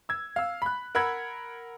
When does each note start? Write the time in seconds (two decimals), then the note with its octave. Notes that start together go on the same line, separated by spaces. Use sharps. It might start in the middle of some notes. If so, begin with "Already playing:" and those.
0.09 E6 G#6
0.36 F5 E6
0.62 B5 F#6
0.95 A#4 F#5 B5 E6 G#6